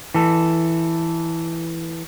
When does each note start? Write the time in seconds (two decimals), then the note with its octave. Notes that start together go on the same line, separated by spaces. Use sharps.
0.14 E3 A4